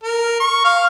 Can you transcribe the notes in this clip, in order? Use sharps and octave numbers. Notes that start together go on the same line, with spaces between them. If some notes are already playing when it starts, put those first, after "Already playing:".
A#4
C#6
F5